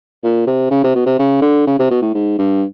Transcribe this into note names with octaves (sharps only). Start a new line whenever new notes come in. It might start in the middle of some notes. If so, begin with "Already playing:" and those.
A#2
C3
C#3
C3
B2
C3
C#3
D3
C#3
C3
B2
A2
G#2
G2